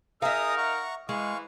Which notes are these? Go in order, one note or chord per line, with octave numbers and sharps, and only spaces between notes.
D#4 G#4 A#4 E5 F5 A#5 D#6 F6
F#5 A#5 C#6
E3 G#3 F5 C#6